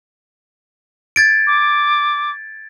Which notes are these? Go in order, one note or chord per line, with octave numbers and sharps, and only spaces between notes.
G#6 A6 D7
D6